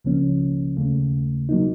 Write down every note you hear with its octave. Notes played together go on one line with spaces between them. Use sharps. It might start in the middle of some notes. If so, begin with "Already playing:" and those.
C#2 C#3 F3 A#3 C#4
D#2 C#3 A3
C3 F#3 A#3 D#4